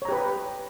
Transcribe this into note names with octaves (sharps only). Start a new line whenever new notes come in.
G4 B4 C#5 A#5